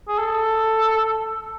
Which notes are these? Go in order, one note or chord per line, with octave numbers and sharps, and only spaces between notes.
G#4
A4